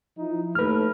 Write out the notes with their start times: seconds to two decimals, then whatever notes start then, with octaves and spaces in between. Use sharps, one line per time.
0.18 F3 D#4 E4
0.55 D#2 A3 B4 F6